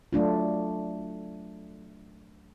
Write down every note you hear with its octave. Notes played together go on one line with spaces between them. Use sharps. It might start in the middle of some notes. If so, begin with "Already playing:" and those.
F#3 A3 D4 F4